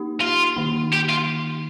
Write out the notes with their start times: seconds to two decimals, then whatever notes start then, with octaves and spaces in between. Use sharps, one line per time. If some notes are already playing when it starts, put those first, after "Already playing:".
Already playing: A#3 D#4 G4
0.21 F4
0.56 D#3 A#3 D#4
0.93 G4
1.10 F4